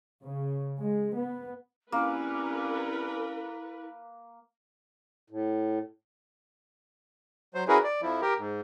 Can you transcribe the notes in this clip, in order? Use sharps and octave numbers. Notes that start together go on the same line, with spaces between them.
C#3
G#3
B3
G2 A#3 C4 C#4 E4 A#4 B4
A2
F#3 C5
C#4 E4 F#4 G#4 A#4 B4
D5
F2 F3 E4
G4 A#4
G#2